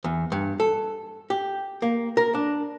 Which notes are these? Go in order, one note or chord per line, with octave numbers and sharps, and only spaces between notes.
E2
G2
A4
G4
A#3
A#4
D4